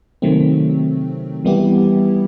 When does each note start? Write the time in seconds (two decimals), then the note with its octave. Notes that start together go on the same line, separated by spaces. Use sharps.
0.22 C3 D#3 F#3 A3 C4
1.45 E3 G3 B3 E4 G4